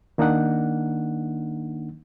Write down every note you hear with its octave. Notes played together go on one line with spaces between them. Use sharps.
D#3 A#3 D4 D#4 F#5